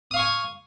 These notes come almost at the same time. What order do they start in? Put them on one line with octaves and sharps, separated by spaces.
D#6 F5 C#6 G#5